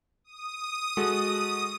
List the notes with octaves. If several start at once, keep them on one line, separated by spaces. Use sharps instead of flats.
D#6
G#3 F#4 A4